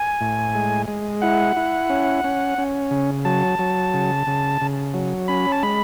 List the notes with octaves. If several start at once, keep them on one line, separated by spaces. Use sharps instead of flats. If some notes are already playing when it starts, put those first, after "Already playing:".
Already playing: G#5
A2
G#3
G#3
E4 F#5
E4
C#4
C#4
C#4
C#3
F#3 A5
F#3
C#3
C#3
C#3
F#3
C#4 B5
A5
G#3 B5